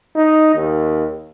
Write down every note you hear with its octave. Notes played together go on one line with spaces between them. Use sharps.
D#4
D#2